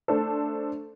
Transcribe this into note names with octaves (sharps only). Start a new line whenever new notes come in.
A3 D4 A4 C5